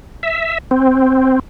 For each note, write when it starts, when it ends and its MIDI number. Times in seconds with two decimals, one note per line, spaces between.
0.23 0.58 76
0.71 1.39 60